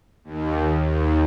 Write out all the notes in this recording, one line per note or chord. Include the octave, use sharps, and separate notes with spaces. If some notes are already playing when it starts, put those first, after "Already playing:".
D#2
D#2